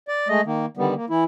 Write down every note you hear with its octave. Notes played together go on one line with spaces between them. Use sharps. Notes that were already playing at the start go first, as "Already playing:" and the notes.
D5
G#3 A3 D#5
D#3 A#3
D3 D#3 G3 B3
A#3
E3 E4